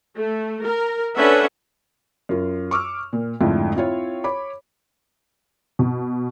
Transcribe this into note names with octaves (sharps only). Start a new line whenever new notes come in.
A3
A#4
C#4 D4 A4 B4 E5 F#5
F#2 F4
C#6 D6 E6 F6
A#2
F2 G#2 D3 A3 E4 F4
C4 E4 F4 C#5
C#5 B5 D6
B2